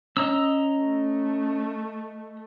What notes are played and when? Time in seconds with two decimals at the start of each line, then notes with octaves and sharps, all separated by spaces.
0.17 C#4 D#5 A#5 E6
0.79 A3